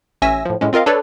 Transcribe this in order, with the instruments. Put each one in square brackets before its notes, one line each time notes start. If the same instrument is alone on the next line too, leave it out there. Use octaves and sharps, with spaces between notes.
[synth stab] A1 C#4 E5 G#5 E6 A#6
A2 F3
A2 G#3 C#4
C4 F4 A#4 D#5 F5
D4 A4 B4 C#5 D5